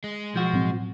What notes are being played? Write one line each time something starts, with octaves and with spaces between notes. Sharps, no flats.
G#3
B1 F3 F#4
A2 F#3 C4